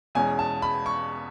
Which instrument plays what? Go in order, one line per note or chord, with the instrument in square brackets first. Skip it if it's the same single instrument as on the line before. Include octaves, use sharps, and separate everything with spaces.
[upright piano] E2 B2 G#3 C#4 G#5
A5
B5
C#6